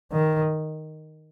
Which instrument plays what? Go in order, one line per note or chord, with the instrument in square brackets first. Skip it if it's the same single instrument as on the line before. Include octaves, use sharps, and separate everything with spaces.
[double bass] D#3